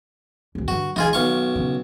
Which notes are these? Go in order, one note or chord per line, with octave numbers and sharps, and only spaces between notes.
D1 D2
G2 D3 F#4
C#2 E3 D#4 F4 G#4
B1 D#3 F5 C#6
C#3